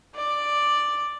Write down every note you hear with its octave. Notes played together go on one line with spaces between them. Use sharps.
D5